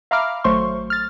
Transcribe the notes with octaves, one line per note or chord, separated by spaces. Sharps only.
E5 F5 A#5 B5 D6 F6
G#1 F#3 A3 C5 C6 C#6
F6 A6